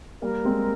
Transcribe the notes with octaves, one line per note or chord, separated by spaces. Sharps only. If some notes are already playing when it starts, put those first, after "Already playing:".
G3 A#3 A#4
G#3 C4